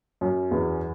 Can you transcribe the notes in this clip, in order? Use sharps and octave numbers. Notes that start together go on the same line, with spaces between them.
F#2
E2